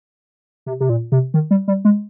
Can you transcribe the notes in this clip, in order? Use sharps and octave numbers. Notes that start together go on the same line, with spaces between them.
C3
C3
A#2
C3
D#3
G3
G3
G#3